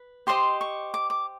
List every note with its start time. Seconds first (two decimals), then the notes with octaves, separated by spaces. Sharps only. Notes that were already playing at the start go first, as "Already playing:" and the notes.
Already playing: B4
0.27 G4 C5 D#5 C6
0.61 C#6
0.94 D6
1.10 D6